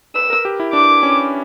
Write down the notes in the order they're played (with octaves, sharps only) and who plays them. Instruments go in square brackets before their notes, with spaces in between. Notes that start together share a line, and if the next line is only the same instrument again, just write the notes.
[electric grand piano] B4 [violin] E6
[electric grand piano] A#4
G4
E4
[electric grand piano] D4 [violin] D6
[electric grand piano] C#4